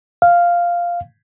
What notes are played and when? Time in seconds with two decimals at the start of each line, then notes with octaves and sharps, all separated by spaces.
0.22 F5